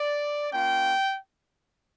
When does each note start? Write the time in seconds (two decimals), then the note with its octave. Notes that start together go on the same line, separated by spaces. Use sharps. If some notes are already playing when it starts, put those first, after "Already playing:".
Already playing: D5
0.52 A#3 C#4 F4 G5